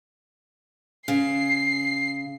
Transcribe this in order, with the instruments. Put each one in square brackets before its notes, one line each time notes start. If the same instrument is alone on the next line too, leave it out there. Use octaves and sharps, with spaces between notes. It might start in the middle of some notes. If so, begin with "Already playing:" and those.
[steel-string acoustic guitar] C#3 [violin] C7